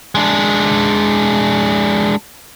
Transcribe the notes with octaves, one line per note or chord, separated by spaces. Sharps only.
G#3 D4